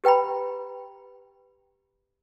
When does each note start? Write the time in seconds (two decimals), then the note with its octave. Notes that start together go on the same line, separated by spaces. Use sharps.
0.04 G4 B4 G5 A#5 B5